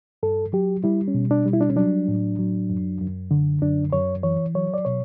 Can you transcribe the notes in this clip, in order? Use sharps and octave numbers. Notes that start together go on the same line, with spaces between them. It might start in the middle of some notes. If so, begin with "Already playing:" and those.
G2 A4
F#3 G4
G3 E4
C#4
B2
D4
G3
E4
D4
C#4
F#3 D4
A2
F#3
F#2
F#2
D3
F#2 D4
F#2 C#5
E3 C#5
F#3 C#5
D5
B2 C#5